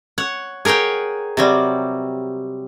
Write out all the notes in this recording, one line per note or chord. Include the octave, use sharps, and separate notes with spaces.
C#5 F#5
G#4 A#4 C#5 F#5 G5
C3 F#3 G3